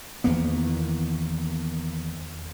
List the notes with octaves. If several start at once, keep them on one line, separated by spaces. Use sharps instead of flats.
E2 D#3 A#3 B3